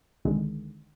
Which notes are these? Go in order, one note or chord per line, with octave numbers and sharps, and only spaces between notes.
C2 D3 D#3 G#3